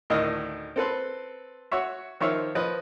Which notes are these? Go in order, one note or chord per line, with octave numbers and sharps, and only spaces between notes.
D2 A2 D#3 D#4 D#5 F5
C4 A4 B4 C6
F#4 C#5 E5
D#3 F3 C#5 E5 F5
F3 B4 D#5